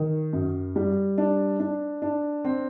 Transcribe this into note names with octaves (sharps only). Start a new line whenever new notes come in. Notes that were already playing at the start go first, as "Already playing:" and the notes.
Already playing: D#3
F#2
G3
D4
D4
D4
C4